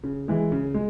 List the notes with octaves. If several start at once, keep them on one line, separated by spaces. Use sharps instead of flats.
C#3
E3 G#3
C#3
G#3